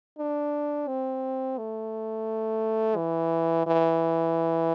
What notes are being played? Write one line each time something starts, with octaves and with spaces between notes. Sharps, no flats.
D4
C4
A3
E3
E3